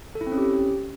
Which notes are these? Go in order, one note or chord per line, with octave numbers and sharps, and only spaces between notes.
A4
E4
C4
C#4
G4